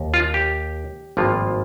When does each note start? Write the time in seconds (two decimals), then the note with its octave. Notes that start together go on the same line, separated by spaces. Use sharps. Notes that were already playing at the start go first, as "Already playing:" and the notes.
Already playing: D#2
0.14 F4
0.34 G4
1.17 G#1 G2 F3 A#3 F4